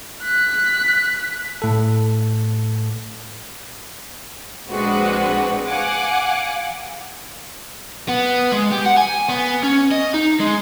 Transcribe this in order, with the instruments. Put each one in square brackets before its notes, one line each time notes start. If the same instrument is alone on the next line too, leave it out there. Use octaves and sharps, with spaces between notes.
[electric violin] F#6 B6
[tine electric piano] A2 A4
[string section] A#1 G#3 C4 D4 F#4 B4
F5 F#5 G#5 D6
[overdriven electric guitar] B3
G#3
G4
F#5
G#5
B3
C#4
D#5
D#4
G#3